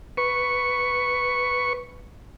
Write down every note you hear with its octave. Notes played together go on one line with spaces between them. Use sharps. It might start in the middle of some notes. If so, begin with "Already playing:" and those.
B4 C#6